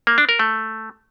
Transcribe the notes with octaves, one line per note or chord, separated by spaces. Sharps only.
A#3
D4
A#4
A3